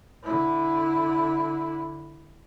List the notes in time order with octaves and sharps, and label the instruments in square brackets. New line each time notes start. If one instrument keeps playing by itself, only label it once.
[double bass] D3 E4